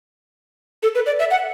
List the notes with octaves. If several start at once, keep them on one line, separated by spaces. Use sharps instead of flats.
A4
B4
D5
E5
F#5